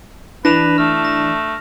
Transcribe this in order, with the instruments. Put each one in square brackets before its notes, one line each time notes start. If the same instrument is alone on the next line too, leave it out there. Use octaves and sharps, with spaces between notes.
[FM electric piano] E3 [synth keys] D4 [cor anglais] B4 [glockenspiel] A#6 E7 F7
[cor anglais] A3 [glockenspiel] F6
[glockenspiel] A#6